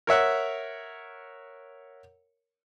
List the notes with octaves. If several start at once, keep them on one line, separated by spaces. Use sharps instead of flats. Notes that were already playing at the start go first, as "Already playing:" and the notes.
A#4 C#5 E5 F#5